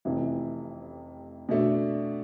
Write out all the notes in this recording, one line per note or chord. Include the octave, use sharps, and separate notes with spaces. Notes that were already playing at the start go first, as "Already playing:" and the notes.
F1 F2 C3 E3
B2 A3 D4